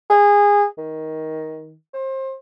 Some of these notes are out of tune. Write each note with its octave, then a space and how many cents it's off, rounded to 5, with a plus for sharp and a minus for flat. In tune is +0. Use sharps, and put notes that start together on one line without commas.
G#4 -20
D#3 +15
C5 +30